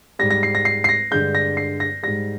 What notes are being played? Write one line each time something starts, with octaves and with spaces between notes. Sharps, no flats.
G#2 G3 A#6
A#6
C7
A#6
C7
C7
A#6
G2 D3 G#3 G6
A#6
C7
A#6
G#2 G3 A#6